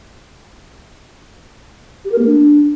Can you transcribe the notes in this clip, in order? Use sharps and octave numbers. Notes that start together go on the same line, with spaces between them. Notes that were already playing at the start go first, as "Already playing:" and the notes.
G4
A#4
A#3
D4